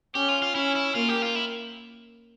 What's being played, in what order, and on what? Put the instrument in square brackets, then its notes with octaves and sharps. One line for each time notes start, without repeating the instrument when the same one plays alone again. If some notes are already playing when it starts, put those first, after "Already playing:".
[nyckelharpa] C#4 [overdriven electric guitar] G4
[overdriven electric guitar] F4
F4
[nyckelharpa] C#4 [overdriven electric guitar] E4
[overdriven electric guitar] E4
[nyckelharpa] A#3 [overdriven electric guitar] F4
[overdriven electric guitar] G4
F4
E4